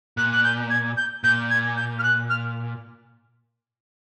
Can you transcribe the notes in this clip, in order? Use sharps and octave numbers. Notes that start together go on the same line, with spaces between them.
A#2 F#6
F#6
G6
G#6
G6
A#2 G6
G#6
G6
F6
F#6
F6